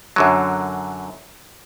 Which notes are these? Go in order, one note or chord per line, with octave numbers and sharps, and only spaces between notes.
F#2 D3 F#3